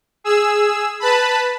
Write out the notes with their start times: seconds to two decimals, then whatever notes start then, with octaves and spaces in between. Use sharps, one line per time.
0.24 G#4 E6
1.00 B4 A5 B5